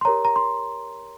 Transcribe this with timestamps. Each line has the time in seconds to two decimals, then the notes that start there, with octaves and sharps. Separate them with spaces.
0.01 C6
0.05 G4 A#4 C#5 A#5
0.25 A#5
0.36 C6